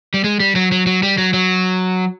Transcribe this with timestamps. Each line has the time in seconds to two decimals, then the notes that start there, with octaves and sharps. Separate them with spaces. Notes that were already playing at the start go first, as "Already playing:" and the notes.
0.14 G3
0.24 G#3
0.40 G3
0.56 F#3
0.72 F#3
0.87 F#3
1.03 G3
1.18 F#3
1.34 F#3